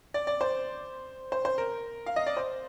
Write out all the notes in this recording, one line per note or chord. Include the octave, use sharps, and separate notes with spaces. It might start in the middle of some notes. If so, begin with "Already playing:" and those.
D5
D5
C5
C5
C5
A#4
F5
D#5
D5
C5